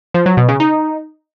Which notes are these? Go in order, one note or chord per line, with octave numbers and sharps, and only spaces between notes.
F3
F#3
B2
C#3
D#4